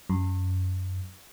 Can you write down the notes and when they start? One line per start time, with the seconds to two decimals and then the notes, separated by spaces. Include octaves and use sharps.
0.10 F#2